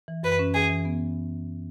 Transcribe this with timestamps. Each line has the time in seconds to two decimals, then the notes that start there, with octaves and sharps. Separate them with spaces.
0.08 E3
0.23 F#2 B4
0.39 C#4
0.54 E3 G#4
0.70 E3
0.85 B3